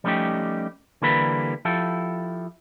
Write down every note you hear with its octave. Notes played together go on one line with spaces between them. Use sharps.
F3 G3 A3 C#4 D#4 G4
D3 E3 G3 A#3 A4 B4
F3 E4 G4 A4